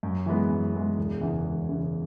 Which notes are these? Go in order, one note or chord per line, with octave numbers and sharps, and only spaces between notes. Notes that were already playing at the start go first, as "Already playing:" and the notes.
F#2
E3 G#3 B3
F#2
E3 G#3 B3
E1
E2 C#3 E3
E1
E2 C#3 E3